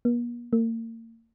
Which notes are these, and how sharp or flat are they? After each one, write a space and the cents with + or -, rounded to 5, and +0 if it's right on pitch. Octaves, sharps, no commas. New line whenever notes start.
A#3 +45
A#3 -40